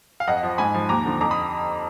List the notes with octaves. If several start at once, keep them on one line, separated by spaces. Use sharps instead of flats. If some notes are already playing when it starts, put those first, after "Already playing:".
F5
F2 D#5 F#5
F3
G#2 G#5 B5
F3
D#2 A#5 D6
D3 F3
F2 A#5 D6
B5 D#6